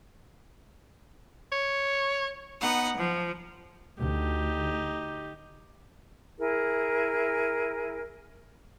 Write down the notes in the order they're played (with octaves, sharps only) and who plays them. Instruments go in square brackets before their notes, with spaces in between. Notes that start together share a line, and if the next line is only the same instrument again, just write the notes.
[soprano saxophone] C#5
[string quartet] B3 D#4 F#5
F3
[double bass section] D2 [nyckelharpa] D#4 G4
[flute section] E4 G#4 A#4